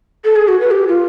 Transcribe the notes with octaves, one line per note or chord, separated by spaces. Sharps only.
A4
G#4
F#4
B4
G4
F4